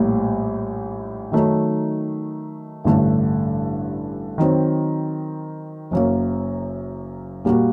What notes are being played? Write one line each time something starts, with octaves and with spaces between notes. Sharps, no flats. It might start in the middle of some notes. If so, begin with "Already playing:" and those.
Already playing: A#1 A2 G3 A#3
D#3 F#3 A3 D#4
A1 G2 D3 A3
D#3 F#3 C4
F#1 F#2 F#3 A#3
A#2 G3 A#3 F#4